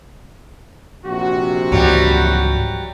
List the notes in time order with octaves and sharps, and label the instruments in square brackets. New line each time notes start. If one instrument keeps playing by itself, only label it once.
[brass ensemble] A#1 C3 F#4
[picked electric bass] C#2 G#2 E3 [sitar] F#3 G3